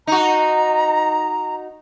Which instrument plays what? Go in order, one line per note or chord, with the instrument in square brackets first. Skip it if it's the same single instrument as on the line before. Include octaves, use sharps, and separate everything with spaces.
[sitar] D#4 F#4 [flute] A#5